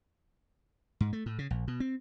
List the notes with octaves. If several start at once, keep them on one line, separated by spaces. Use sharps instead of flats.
G#2
A3
A2
C#3
A#1
B2
C4